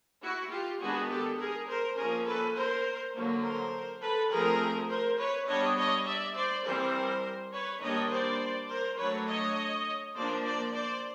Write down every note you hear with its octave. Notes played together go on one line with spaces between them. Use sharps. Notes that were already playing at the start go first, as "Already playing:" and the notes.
E4 F#4
F4 G4
D#3 G#3 B3 D4 F#4 G#4
G4 A4
G#4 A#4
A#4 C5
F3 A#3 C#4 G#4 A#4
A4 B4
A#4 C5
D3 F#3 A#3
A#4 C5
A4 B4
F3 A3 C4 G#4 A#4
A#4 C5
B4 C#5
G3 B3 D4 C#5 D#5
C#5 D#5
D5 E5
C5 D5
E3 G3 C4 A#4 C5
B4 C#5
D#3 G3 A#3 D4 C#5 D#5
C5 D5
A#4 C5
F#3 A3 D4 B4 C#5
C#5 D#5
F3 A#3 D4 C5 D5
C5 D5
C5 D5